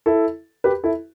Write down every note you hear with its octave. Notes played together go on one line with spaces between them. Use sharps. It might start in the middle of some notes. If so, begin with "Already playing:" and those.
E4 A4
G4 B4
E4 A4